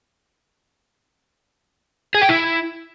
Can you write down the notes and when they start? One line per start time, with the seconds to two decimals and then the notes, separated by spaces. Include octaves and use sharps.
2.15 G#4
2.22 G5
2.29 E4